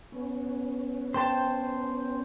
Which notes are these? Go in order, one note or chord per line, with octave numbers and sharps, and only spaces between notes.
B3 C#4
C5 G5 A5